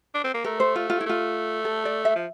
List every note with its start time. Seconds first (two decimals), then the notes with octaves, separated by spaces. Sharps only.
0.15 D4
0.24 C4
0.34 A#3
0.44 A3 A#4
0.60 C5
0.76 F4
0.90 F4
1.01 E4
1.06 A3 F4
1.65 A4
1.85 D5
2.05 E5
2.16 F3